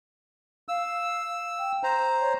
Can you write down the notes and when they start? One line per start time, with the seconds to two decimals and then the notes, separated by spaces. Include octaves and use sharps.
0.68 F5 E6
1.59 G5
1.83 C5 A#5
2.20 C#5